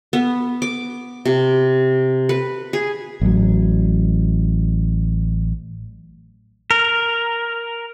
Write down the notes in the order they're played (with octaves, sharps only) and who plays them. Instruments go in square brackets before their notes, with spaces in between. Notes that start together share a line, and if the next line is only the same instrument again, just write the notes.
[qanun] B3
D6
C3
B4
G#4
[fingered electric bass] A1 F#3
[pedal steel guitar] A#4